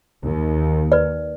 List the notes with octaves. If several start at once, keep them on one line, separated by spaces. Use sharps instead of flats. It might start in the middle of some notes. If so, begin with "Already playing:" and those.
D#2
B4 D5